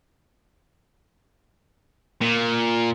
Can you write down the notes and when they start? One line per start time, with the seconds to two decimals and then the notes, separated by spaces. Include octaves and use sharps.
2.21 A#2